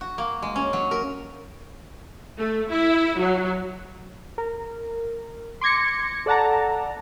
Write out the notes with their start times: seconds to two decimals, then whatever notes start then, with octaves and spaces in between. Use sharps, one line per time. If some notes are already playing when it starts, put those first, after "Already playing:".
0.01 F#4
0.18 A#3
0.42 G#3
0.56 C#4
0.73 F#3
0.91 A#4
2.38 A3
2.70 E4
3.19 F#3
4.38 A#4
5.61 C6 D6 G#6 A#6 C#7
6.26 A4 D5 F#5 A5 A#5